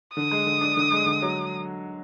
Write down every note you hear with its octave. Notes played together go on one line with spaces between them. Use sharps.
D3 D#6
G#3
D3
D4
D3
G#3
D3
F#3